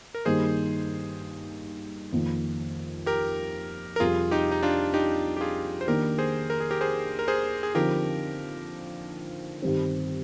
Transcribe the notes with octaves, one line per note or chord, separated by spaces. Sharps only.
A#4
G2 D#3 A#3 D#4 G#4 C5
F2 D#3 A#3
G4 A#4
A#4
F2 C3 G3 F4 G#4
D#4 G4
D#4
D4 F4
D#4 G4
G4
F4 G#4
C5
D#3 A#3 D4 G4 A#4
G#4 C5
A#4
G#4
G4 A#4
G#4 C5
A#4
G#4 C5
G#4
D3 F3 C4 D#4 G4 A#4
G2 D#3 G3 C4